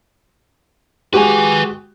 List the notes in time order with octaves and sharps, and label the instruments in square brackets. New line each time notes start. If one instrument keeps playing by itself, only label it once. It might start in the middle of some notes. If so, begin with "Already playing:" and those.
[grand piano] G#3 F#4 G4 [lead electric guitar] B4 G#5